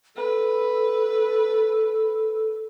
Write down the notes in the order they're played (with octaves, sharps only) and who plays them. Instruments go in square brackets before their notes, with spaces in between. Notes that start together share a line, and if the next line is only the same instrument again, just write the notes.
[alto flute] A4 [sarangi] B4